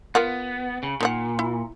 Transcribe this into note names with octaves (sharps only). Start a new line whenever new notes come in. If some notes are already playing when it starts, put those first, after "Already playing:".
B3 F4 A#4 F#5
C#3
A#2 D#3 D#4 F#5
E4